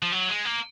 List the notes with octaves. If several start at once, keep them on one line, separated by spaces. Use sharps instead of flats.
F3
F#3
G#3
A#3